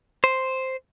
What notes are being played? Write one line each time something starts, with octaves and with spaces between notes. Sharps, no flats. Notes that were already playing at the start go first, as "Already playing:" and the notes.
C5